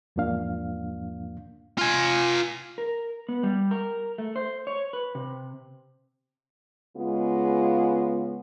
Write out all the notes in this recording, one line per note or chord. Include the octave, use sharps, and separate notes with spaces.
E2 G#2 F3 A#3 D4 F5
F4 G#5
A#4
B3
G3
A#4
A3
C5
C#5
B4
C3
C#3 G#3 B3 F4